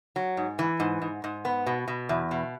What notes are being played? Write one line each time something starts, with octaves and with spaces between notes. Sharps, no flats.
F#3
G#2
E3
G#2
G#2
G#2
B3
B2
B2
E2
B2